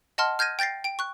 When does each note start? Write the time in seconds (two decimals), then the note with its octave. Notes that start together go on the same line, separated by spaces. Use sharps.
0.18 D#5 F#5 A5 C6 F6
0.39 F6 G6 G#6 A#6 D#7
0.59 G5 G6 A6 A#6 C7
0.84 G5 D7
0.99 C#6 F#6